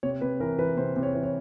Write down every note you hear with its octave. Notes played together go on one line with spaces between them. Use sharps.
C3 C#5
C3 B4
E3 A#4
E3 B4
C3 C5
C3
C#5
E3
C#5